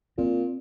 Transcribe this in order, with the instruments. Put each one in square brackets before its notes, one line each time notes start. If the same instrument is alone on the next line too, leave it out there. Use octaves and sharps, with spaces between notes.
[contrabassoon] A#2 [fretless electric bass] C4